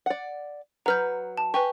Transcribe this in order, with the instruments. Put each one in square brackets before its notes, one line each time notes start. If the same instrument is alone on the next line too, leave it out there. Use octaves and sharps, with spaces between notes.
[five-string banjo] D5 F#5
[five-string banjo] F#3 B4 [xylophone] A#5 F6 G6
[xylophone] A5
[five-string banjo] G4 [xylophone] B4 G#5 C#6